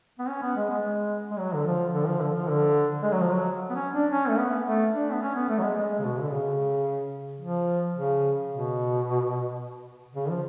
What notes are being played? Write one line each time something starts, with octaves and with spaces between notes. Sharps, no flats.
B3
C#4
B3
G#3
G#3
G#3
F#3
D3
F3
D3
F3
D3
F3
D3
G#3
F#3
F3
F#3
B3
C#4
D4
C#4
A3
B3
A3
D4
B3
C#4
B3
A3
F#3
G#3
G#3
C#3
B2
D3
C#3
F3
C#3
B2
C#3
F3